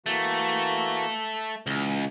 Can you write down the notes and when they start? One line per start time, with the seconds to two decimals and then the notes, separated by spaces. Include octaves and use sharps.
0.06 E3 A3 A#3 F#4
1.67 C#2 E3